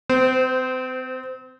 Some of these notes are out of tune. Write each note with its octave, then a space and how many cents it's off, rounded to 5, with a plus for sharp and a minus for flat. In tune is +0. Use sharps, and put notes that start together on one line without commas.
C4 -35 C5 -15